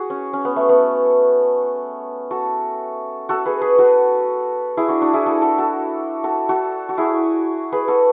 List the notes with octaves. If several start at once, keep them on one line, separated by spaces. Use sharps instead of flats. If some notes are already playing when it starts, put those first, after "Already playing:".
Already playing: F#4 G#4
C#4
C#4
B3
A3
B3
F#4 A4
F#4 A4
G#4 B4
G#4 B4
F#4 A4
E4 G#4
D4 F#4
D4 F#4
E4 G#4
F#4 A4
F#4 A4
F#4 A4
F#4 A4
F#4 A4
F#4
E4 G#4
G#4 B4
F#4 A4